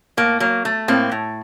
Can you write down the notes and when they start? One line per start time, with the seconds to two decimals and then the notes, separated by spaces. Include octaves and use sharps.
0.17 A2 A#3
0.40 F#3 A#3
0.65 A3
0.88 A2 A#3 C4
1.12 A2